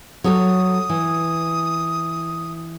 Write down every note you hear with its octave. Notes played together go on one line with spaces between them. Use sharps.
F#3 A4 C#5 D#6
E3